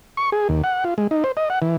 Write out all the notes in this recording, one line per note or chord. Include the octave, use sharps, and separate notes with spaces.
C#6
G#4
D#2
F#5
F4
G#3
D#4
C5
D#5
F#5
E3